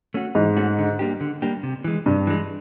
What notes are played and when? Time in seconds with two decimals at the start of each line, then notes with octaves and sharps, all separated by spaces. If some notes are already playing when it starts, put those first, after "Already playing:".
0.14 A3 C#4 F#4
0.35 G#2 E3
0.57 A3 C#4 F#4
0.79 D3
0.99 G3 A#3 D4 G4
1.21 D3
1.42 G3 A#3 D4 G4
1.63 C3
1.84 E3 G#3
2.06 G2 C3
2.27 E3 G#3